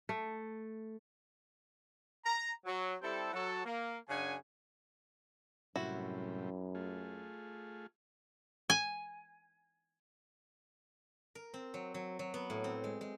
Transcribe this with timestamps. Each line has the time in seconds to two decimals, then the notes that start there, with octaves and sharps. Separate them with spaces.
0.09 A3
2.25 A#5
2.65 F#3
3.02 G3 C4 E4 G4 A4
3.33 F#3 F#4 A4
3.65 A#3
4.09 F#2 C#3 D4 F#5 G#5
5.76 F#2 A2 C3 G3 E4 F#4
6.75 A3 F4 G#4
8.70 G#5
11.35 A#4
11.54 C4
11.74 F#3
11.94 F#3
12.19 F#3
12.34 B3
12.50 A2
12.64 C4
12.84 G#3
13.01 G#3